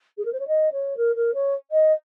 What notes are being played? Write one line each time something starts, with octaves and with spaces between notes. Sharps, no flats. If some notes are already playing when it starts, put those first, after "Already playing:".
G#4
A#4
C5
C#5
D#5
C#5
A#4
A#4
C#5
D#5